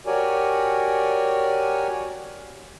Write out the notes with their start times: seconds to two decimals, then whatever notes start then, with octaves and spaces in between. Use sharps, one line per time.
0.06 F#4 G4 A#4 C#5 D5 G#5